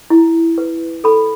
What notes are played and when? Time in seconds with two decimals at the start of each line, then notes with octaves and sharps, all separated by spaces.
0.10 E4
0.58 B4
1.04 A4 B5